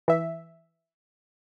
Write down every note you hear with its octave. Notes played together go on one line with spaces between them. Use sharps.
E3 E5